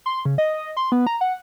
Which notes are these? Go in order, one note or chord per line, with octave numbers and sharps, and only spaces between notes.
C6
C#3
D#5
D#5
C6
B3
A#5
F#5